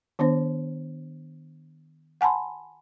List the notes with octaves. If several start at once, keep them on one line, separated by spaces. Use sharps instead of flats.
D#3 B3 D4 C5
F#5 G#5 A5 B5 C6